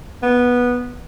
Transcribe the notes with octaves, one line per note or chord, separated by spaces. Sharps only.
B3